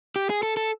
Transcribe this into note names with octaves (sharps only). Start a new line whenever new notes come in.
G4
G#4
A4
A4